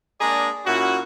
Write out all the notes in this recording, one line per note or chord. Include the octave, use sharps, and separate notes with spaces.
G#3 A#3 D4 G#4 D5 A#5
A#2 C#4 E4 F#4